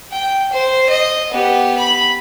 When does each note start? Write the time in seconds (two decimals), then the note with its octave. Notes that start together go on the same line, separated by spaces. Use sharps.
0.12 G5
0.53 C5
0.89 D#5
1.31 B3 G4
1.78 B5